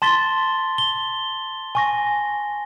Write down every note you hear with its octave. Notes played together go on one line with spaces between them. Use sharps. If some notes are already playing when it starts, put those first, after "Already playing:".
A5 C6 A6 B6 G7
G7
G#5 C#6 A#6